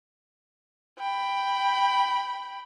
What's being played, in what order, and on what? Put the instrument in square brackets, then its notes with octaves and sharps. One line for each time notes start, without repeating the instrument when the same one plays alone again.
[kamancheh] G5 B5